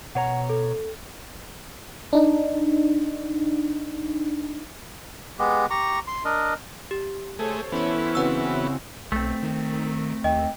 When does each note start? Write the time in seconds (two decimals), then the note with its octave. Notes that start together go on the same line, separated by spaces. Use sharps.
0.15 B2 C#5 F#5 A#5
0.50 A4
2.13 D4 D#4
5.39 G#3 B3 G4
5.70 G4 A#5 C#6
6.07 C6
6.25 D4 A#4 D#5
6.91 G4
7.39 A3 G#4 A4 C5 C#5
7.72 E3 B3 C#4 E4
8.15 C#3 C4 F#4 B4 F#5 E6
9.12 B1 A3 C4
9.43 D#3
10.24 D#2 D#5 G5